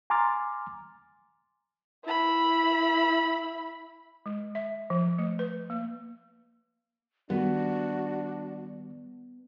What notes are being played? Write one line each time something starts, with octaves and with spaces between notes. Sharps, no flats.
G#5 A#5 C6 D6 F6 A6
E4 B5
G#3
E5
F3
A3
B4
A#3
D#3 G3 B3 D4 F#4